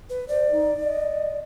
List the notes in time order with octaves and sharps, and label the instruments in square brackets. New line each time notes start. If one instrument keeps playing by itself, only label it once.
[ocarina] B4
[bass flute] C5 [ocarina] D5
[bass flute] D#4
D#5